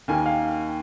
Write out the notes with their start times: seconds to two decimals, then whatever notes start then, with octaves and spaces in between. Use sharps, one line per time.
0.08 D#2 D#3 A#3 G#5
0.26 F5